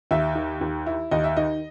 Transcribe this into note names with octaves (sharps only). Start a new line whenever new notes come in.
D#2 E5
D#3
D#2
E4
D#2 D#5
E5
D#3 D#5